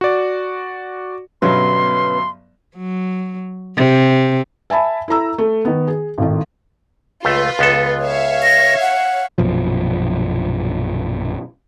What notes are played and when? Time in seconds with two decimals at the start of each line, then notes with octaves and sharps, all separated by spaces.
0.01 F#4 D5
1.42 G1 G2 B2 F#3 C#4 B4 C6
2.76 F#3
3.76 C3
4.70 E5 G#5 A5 B5
5.08 E4 A4 A#5 E6
5.38 A3
5.65 D#3 B3
5.88 G#4
6.18 G#1 A2 D#3
7.25 C#2 A3 F4 B4
7.59 C#2 B3 A4
8.03 C#5 E5 F5
8.43 A#6
8.81 F#5
9.38 A#1 F#2 B2 F3